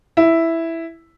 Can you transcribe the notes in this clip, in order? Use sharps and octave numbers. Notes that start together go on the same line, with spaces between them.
E4